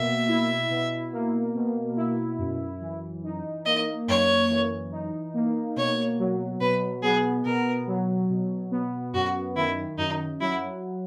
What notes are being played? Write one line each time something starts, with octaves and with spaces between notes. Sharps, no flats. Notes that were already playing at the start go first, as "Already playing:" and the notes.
Already playing: B2 A#3 E5
E4
B2
A#3
B2
E4
F#2
E3
D#4
A#3 D#5
F#2 C#5
E3
D#4
A#3
B2 C#5
F#3
B2 B4
B3 G#4
B2 A#4
F#3
B2
B3
F#2 F#4
D#3 E4
F#2 D#4
F#3 E4